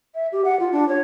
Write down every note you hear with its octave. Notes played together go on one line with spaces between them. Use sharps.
E5
G4
F#5
F4
D4
C#5